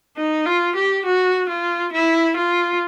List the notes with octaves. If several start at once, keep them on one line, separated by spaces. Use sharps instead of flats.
D#4
F4
G4
F#4
F4
E4
F4